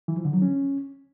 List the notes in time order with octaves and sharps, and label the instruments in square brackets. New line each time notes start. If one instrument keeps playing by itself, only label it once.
[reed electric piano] E3
F3
D3
F#3
C#4